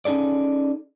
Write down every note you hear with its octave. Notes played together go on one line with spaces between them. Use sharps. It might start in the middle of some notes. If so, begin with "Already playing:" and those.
C#4 D#4 G#4 A4 D5